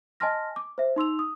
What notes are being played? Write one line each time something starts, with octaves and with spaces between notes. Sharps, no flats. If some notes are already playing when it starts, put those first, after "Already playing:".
D#5 G#5 A5 C6 F6 A#6
D6
C5 E5
D#4 C6 E6 F7
D#6